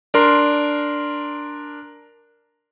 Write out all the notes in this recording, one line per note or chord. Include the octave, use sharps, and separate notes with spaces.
D4 A#4 C6